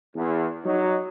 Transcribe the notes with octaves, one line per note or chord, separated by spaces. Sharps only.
E2
F#3 D#4 C#5